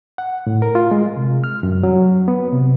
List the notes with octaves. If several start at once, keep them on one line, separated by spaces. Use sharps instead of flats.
F#5
A2
A#4
F4
G#3
C3
F6
F#2
F#3
B3
C3